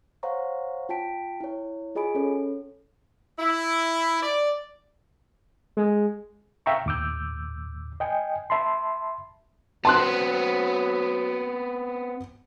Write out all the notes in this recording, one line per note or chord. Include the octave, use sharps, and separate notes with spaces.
C5 C#5 F5 F#5 A#5 C#6
F4 G5 A5 B6 D7
E4 C#5
F4 G#4 D#5 G#5 B5 D7
C#4 A4 C#5
E4
D5
G#3
E5 F5 G5 A#5 C#6
D#2 A2 D6 E6 G6
D#5 G5 G#5
E5 A5 B5 C6
F#3 B3 C4 A5 C6 F#6